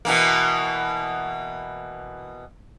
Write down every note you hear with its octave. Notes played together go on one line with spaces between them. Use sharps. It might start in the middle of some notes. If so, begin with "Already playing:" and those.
B2 E3 A#3